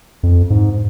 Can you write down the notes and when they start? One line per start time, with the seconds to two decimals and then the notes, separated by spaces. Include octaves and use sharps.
0.23 F2
0.50 G#2